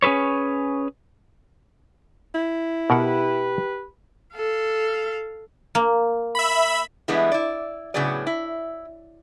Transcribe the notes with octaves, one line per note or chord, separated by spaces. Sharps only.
C#4 G#4 A4 B4 C#5
E4
B2 G4 A#4 B4 F#5
A4 F5
A#3
E5 B5
E3 G3 G#3 B3 D4 E4
E4 D5
A2 C#3 F#3 B3 G#4 D5
E4